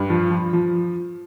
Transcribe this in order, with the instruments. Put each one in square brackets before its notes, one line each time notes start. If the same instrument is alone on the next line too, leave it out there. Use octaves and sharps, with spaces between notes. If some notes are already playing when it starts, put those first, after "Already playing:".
Already playing: [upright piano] G2
F3
F3
F3